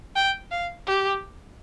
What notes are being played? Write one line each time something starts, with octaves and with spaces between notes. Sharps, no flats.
G5
F5
G4